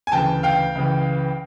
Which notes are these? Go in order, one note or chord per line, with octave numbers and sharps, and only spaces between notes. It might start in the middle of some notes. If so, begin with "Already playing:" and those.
G#5
D2 C#3 E3 G5 A5
F5 G5
C#2 C#3 E3